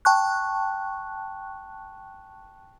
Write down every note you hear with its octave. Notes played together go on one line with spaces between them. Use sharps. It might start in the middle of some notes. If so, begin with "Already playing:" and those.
G5 A5 C#6 F#6